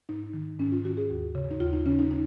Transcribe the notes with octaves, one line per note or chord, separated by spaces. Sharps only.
G#2 D#4
D#3
G#2 C#4
F4
D#3 F#4
G#4
D#2
C#3
D#4
D#2 F4
D#4
C#3 C#4
D#4
D#4